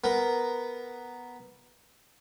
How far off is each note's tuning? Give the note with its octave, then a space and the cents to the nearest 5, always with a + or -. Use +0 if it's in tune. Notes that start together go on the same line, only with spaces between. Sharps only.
B3 +0 A#4 +0